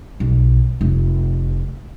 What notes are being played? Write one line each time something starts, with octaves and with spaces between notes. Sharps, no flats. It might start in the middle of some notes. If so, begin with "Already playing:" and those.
B1
F1